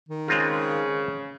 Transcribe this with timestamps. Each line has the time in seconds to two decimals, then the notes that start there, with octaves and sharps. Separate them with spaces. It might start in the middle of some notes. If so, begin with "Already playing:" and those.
0.09 D#3
0.28 C#3 G#3 C4 F4